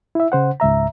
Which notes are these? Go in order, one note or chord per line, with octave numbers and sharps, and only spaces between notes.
E4 E5
C#3 C5 F#5
C#2 G#2 E5 A#5